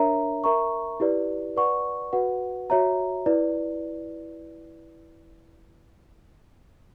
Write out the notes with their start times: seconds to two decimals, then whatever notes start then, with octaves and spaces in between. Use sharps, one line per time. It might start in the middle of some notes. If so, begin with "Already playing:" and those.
Already playing: D4 A#4 C#5 E5 A#5
0.44 A#4 E5 A#5 C#6
1.00 E4 G4 B4 D5
1.57 B4 D5 F#5 C#6
2.13 F#4 B4 F#5
2.70 F#4 C#5 E5 A#5
3.26 E4 B4 D5